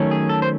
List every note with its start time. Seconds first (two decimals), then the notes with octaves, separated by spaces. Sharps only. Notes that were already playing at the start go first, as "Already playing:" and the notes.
Already playing: D#3 F#3 A3 C#4
0.11 G#4
0.29 A4
0.42 C5